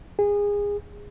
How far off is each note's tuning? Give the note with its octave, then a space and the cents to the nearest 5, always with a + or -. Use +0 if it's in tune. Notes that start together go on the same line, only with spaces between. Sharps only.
G#4 -25